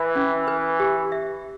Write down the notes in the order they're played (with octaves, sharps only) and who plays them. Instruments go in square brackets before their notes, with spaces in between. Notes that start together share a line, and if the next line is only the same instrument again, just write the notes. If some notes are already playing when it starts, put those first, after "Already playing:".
Already playing: [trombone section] E3 [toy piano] E5
[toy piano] C#4
B4
G4
E5